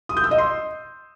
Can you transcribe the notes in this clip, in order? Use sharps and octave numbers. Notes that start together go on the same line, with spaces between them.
D#6
G6
E6
D#5
C6